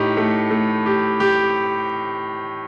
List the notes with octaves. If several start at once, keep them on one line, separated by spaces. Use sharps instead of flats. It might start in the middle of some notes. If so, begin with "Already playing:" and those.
Already playing: A2 D#4 G4
A3
A3
G4
G4